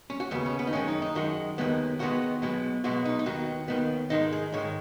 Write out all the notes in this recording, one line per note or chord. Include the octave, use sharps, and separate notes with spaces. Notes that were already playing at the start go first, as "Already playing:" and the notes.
C#4
F#4
D#2 C#3 B3
C#4
B3
D#4
F#2 D#3 G#3 C#4
D#4
D#4
F#2 D#3 G#3 F#4
D#2 D#3 G#3 B3
D#2 D#3 G#3 B3 F#4
B1 B2 G#3 B3
B1 B2 G#3 B3 F#4
D#4
D#4
D#2 D#3 B3 F#4
D#2 D#3 B3
G#2 D#3 G#3 D#4
G#4
G#2 D#3 G#3 C#5